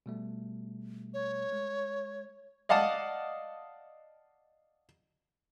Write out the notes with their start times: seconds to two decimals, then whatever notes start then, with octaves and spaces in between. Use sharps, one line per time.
0.06 B2 G3 A3
1.14 C#5
1.52 G#3
2.69 D5 D#5 F5 F#5 A5 D#6